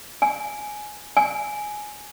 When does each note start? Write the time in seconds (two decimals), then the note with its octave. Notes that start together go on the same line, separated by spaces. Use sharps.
0.22 G#5
1.17 G#5